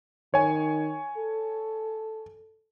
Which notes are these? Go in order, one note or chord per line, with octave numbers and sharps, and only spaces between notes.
D#3 C#5 G#5
A4